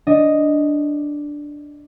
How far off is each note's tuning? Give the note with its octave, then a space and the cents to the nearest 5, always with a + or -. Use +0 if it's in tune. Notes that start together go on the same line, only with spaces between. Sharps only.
D4 +0 D#5 +0